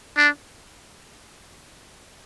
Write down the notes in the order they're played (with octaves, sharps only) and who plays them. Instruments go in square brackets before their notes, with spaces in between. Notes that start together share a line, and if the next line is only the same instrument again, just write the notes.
[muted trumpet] D4